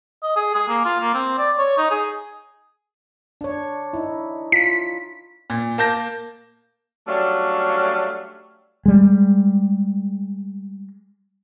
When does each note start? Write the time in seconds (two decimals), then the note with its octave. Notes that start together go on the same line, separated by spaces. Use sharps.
0.23 D#5
0.36 G#4
0.55 G#4
0.69 A#3
0.85 F4
1.01 A#3
1.15 C4
1.38 D5
1.58 C#5
1.78 D#4
1.91 G#4
3.41 D4 C#5
3.93 D#4 E4
4.52 F4 B6
5.50 A#2
5.78 A#3 A5 G6 A#6
7.07 F#3 G3 A3 C#4 D4 F5
8.86 G3 G#3